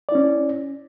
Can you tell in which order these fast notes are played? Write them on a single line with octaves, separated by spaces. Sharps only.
D5 E4 C#4